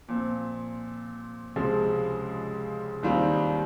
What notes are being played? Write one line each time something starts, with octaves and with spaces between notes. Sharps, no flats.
A#2 F3 C4
C#2 C3 F3 G#3
D#2 D#3 G3 C4 F4